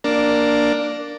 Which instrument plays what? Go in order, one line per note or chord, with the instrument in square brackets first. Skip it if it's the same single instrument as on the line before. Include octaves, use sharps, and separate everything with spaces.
[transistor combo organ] A#3 D4